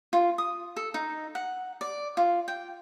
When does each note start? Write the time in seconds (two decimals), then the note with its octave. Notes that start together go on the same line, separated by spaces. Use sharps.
0.13 F4
0.38 D#6
0.76 A4
0.94 D#4
1.35 F#5
1.81 D5
2.17 F4
2.48 G5